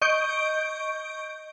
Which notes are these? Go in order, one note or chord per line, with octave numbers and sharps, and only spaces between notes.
D#5 C#6 G6 D7